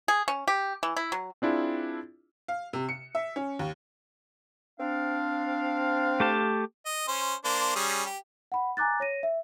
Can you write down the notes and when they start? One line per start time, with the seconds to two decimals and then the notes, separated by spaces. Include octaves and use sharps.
0.08 G#4
0.28 C#4
0.48 G4
0.83 E3
0.97 E4
1.12 F#3
1.42 C4 D4 E4 F4 G#4
2.48 F5
2.73 C3
2.89 C#7
3.15 E5
3.36 C#4
3.59 D#2
4.80 C4 D4 F5
6.20 A3 G4 A5
6.86 D#5
7.08 C#4 C5
7.44 A#3 D4 C5
7.76 G3 C#4 G#4
8.06 G4
8.52 F#5 B5
8.77 G#5 A#5 D6 F#6 A6
9.00 C#5 A#6 D#7
9.23 E5